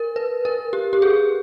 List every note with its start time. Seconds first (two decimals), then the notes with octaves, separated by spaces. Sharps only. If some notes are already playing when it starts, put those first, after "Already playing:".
Already playing: A#4
0.16 B4
0.45 A#4
0.73 G4
0.93 G4
1.02 G#4